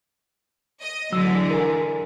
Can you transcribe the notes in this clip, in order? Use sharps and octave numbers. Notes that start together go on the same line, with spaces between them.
D#5
D3 E3 F#3 G#3 E6
A#4 G#5